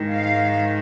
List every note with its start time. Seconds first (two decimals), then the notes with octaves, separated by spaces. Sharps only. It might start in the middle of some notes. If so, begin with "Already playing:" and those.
Already playing: G#2 D#3 G#3
0.11 F5